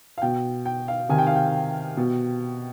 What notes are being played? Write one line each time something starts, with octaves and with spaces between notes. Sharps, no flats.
F5
B2 G5
G5
F5
C3 D#3 G#5
G5
F5
G5
B2